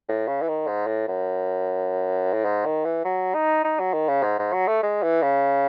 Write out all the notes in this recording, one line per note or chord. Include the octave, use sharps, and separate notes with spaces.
A2
C#3
E3
D#3
G#2
A2
F#2
A2
G#2
D#3
E3
F#3
D#4
D#4
F#3
D#3
C#3
G#2
G#2
F#3
A3
G#3
E3
C#3